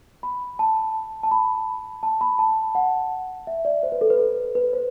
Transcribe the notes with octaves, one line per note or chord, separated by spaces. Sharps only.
B5
A5
A5
B5
A5
B5
A5
F#5
E5
D5
C5
B4
A4
B4
A4
B4
C5